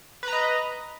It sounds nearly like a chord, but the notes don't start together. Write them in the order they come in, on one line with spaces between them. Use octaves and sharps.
B4 A#5 D#5